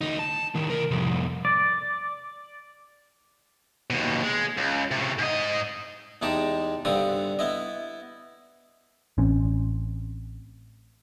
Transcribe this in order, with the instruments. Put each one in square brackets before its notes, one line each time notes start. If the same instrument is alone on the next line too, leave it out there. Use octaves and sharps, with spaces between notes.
[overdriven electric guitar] D2 D#4
A5
A2 D#3
C3 A#4
C2 F2
[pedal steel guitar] D5
[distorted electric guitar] D#2 B2
G#3
C#2
A2 C3
G#2 D#5
[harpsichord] E2 G#3 D#4 G4 A5
G2 D3 B3 C4 D#6
B3 E4 D#5
[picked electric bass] A1 C4 C#4